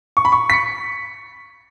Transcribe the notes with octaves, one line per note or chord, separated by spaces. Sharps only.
C#6
B5
C#6
B6
C#7